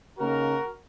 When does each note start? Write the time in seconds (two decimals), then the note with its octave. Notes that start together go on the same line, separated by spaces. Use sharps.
0.18 C#3 A#3 D#4 F#4 A#4